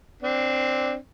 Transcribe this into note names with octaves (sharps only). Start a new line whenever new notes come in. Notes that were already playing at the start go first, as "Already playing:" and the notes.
C4 D4